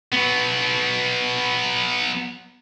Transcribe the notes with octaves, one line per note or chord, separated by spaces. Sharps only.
F#3 B3